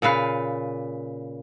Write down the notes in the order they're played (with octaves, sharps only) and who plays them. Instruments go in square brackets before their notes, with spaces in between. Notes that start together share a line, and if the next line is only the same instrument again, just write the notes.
[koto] A#2 C#3 B4 F5